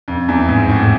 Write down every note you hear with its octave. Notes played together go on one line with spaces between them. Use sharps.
F2
E2
G#2
A2